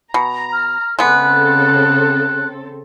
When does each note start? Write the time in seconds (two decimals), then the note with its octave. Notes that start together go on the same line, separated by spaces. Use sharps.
0.14 B2 A#5
0.53 F6
0.99 C#3 G#3 B3 C4 A4 F#6